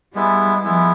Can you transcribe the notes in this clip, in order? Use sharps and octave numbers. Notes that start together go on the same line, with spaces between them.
G3 G#3 B3 E4
F3 G#3 B3 E4